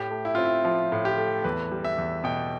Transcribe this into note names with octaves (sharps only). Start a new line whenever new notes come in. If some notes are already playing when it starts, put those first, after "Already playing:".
Already playing: A2 G4
A3
E4
C4 F4
E4
F3 F4
A2
G4
A3
E2 B4
G3
E5
E2
B2 G5